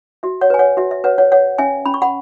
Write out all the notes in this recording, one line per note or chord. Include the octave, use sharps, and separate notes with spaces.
F#4 E5
C#5 F#5
B4 G#5
C#5 F#5
F#4 E5
E5
B4 C#5 F#5
C#5 F#5
C#5 F#5
C#4 E5 G#5
C#4 B5
C#6
F#5 B5